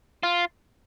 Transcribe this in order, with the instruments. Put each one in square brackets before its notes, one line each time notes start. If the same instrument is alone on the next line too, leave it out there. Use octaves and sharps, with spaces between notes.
[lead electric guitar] F4